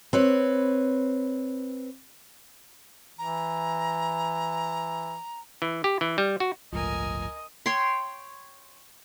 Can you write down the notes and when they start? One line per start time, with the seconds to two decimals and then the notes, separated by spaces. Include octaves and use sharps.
0.13 C4 B4 C#5
3.19 E3 A#5
5.62 E3
5.84 G4
6.01 E3
6.18 G3
6.40 F#4
6.73 G1 C#2 A2 F3 A#4 D#5 G#5
7.66 C#5 G5 C6